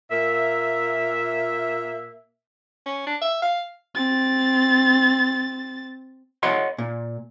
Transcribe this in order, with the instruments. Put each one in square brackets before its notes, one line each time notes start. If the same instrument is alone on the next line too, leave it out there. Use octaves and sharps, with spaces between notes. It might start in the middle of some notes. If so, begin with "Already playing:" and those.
[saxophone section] A#2 A#3 E5
[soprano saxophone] C#4
D4
E5
F5
[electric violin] C4 A6
[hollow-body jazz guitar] C#5 D#5 F#5 C6
A#2